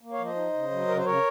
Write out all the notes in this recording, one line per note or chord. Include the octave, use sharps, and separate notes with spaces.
A#3
C#5 F5
F3
C5 D#5
D#4
C#3
F#3
C#3 A#4
C5
C#3 A#4 C#5